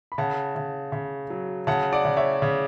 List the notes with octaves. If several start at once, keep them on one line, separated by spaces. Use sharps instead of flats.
B5
C#3 F#5 A5
C#3
C#3
F#3
C#3 F#5 A5
D5 F#5
C#3
C#5 E5
C#3